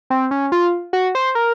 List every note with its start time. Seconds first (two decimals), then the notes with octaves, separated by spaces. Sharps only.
0.10 C4
0.31 C#4
0.52 F4
0.93 F#4
1.15 C5
1.35 A#4